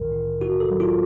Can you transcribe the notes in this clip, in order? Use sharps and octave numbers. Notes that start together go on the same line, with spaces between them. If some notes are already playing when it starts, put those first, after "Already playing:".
Already playing: C2 A2 D#3 A#4
A2
A2 F#4
A4
F#3
F4